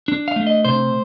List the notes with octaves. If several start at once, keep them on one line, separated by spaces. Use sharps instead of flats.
D4
F5
A3
D#5
C3 C5